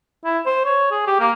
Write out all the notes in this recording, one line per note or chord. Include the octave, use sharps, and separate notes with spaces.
E4
C5
C#5
G#4
G4
A#3